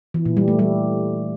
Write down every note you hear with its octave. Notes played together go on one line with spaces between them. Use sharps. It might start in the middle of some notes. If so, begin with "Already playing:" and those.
E3
A#2
G3
A3
G3